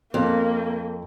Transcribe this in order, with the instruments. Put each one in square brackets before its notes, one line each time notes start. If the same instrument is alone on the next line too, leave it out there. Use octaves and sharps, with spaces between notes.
[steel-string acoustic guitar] F2 [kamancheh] A#3